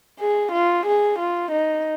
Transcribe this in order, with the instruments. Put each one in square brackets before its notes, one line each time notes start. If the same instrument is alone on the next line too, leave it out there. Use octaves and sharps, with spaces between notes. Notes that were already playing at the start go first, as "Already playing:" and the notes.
[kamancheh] G#4
F4
G#4
F4
D#4